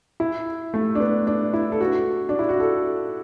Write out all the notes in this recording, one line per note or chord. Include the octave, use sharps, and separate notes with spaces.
E4
A3
D4
B3
D4
E4
A4
F#4
D4
E4
F#4
A4